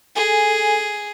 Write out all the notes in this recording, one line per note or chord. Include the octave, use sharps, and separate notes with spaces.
G#4 A4 G#5